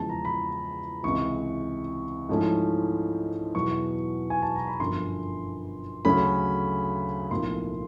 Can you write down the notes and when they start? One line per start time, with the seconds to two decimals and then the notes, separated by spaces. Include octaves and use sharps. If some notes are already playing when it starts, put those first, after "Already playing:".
Already playing: E2 C#3 F3 G#3 A5
0.09 A#5
0.25 B5
1.03 C#2 C3 E3 C#6
2.29 G#2 F3 A3 C#4 E4
3.55 E2 B2 F#3 B3 E4 C#6
4.30 G#5
4.42 A5
4.56 A#5
4.68 B5
4.79 G1 F#2 D3 F3 C6
6.05 D2 C#3 F#3 A3 C#4 B5
7.30 B1 A2 F3 A#3 C6